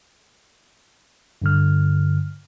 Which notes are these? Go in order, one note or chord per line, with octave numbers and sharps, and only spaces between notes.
G2 D3 F6